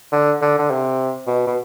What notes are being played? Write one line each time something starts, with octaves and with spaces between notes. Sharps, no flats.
D3
D3
D3
C3
B2
B2